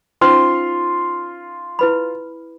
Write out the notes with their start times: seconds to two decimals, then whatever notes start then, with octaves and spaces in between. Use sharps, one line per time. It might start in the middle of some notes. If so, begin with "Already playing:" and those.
0.21 C#4 D#4 F4 C5 C6 F6
1.79 E4 B4 B5